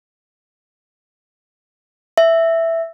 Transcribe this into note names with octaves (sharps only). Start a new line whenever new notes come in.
E5